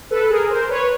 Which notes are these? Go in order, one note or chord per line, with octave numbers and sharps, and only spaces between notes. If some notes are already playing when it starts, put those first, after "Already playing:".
A4 B4
G#4 A#4
A#4 C5
B4 C#5